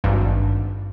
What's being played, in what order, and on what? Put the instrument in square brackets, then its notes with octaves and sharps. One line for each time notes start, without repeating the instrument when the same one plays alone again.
[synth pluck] G#1 G2